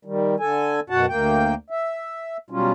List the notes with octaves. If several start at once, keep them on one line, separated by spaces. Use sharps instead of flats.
D#3 G3
D3 A4 G#5
F#2 B2 F#4 F#5 A5
D2 A#3 G5
E5
B2 F#3 G3 C#4 F4